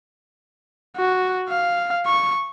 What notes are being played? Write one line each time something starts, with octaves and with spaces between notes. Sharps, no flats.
F#4
F5
C#6